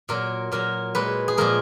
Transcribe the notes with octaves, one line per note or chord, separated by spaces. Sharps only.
A#2 F#3 A#4
A#2 F#3 A#4
A#2 G#3 B4
G#4
A#2 F3 G#3 A#4